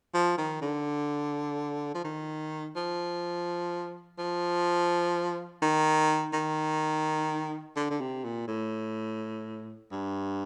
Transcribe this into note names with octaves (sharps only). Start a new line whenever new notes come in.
F3
D#3
D3
F3
D#3
F3
F3
D#3
D#3
D3
D3
C3
A#2
A2
G2